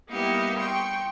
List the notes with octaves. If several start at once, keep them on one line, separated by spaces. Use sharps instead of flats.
G3 A#3 B3 D#4 E4 G4
G5 C6 C#6